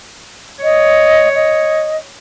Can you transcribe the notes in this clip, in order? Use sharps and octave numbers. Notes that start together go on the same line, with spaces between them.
C#5 D#5
D#5